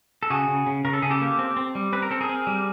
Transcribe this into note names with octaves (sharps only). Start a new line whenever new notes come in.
A4
C#3 F#4 G#4
C#3
C#3
C#3 A#4
A4
C#3 G#4
G4 A4
A#3
C4
C4
G3
C4 B4
A#4
C4 A4
G#4 A#4
C4
G3